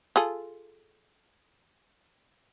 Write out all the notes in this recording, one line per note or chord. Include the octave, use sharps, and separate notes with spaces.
F4 G#4 A4